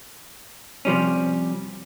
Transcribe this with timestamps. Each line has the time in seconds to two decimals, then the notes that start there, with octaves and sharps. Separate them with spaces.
0.85 C3 F3 G3 C#4